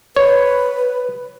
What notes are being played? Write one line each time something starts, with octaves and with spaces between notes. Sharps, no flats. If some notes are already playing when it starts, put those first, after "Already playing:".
B4 C#5